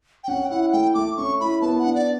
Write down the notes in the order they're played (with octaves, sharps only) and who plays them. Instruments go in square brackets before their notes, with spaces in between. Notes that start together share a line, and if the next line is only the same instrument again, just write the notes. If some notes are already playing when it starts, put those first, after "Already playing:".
[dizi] G5
[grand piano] C#4 [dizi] F#5
[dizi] G5
[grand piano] E4 [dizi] F#5
[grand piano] A3 [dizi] G5
[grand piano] A3 [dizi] D6
[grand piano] C#4 [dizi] C#6
[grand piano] E4 [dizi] B5
[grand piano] B3 [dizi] A5
[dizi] F#5
[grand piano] D4
[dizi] D5